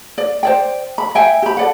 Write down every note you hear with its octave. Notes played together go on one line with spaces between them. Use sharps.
D5
C5 D5 G5
B5
E5 G5 G#5
G4 B5
A4 D5 F#5